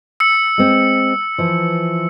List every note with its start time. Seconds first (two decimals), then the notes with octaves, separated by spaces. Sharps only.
0.20 E6 C#7
0.58 G#3 C4
1.38 E3 F3